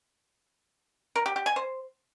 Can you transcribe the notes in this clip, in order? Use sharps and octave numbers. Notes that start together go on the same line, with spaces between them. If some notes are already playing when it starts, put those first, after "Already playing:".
A#4
G4
G4
G#5
C5